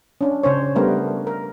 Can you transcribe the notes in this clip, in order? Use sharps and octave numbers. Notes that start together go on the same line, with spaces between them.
C#4 D4
C#3 C#4 C5 C#5
G3 A3 B3 D4 A#4 C5
A#4